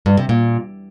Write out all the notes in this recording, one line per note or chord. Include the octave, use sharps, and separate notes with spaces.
G2
C3
A#2